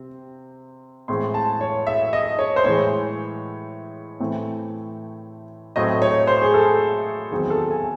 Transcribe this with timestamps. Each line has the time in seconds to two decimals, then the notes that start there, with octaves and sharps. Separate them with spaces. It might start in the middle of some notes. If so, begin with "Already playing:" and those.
Already playing: C3 C4
1.08 A2 E3 G#3 C4 C6
1.34 A5
1.61 C#5
1.87 E5
2.13 D#5
2.39 C#5
2.56 C5
2.64 A2 E3 G#3 C#5
4.20 A2 E3 A3 C4
5.76 A2 F#3 A3 C4 D#5
6.02 C#5
6.27 C5
6.42 G#4
6.54 A4
7.31 E2 D#3 F#3 C4 G#4
7.50 A4
7.71 G#5